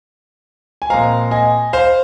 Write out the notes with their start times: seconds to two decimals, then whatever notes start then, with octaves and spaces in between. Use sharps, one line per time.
0.82 G#5
0.90 A#2 F3 G#3 C4 F5 A#5
1.31 D#5 G#5
1.73 C5 F5